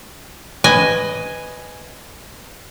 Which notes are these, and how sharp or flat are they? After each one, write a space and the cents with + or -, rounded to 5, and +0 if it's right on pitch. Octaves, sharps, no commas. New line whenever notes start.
B4 +10 D#5 +0 G#5 +0